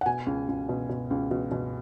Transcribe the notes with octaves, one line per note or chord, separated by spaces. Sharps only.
F#5
B2 G#5
C#2
C#2
B2
B2
C#2
B2
B2